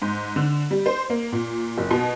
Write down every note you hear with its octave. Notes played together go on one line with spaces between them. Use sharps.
G#2
D3
G3
C5
A#3
A#2
F#1
B2